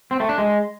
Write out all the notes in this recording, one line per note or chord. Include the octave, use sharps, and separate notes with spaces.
C4
A3
D4
G#3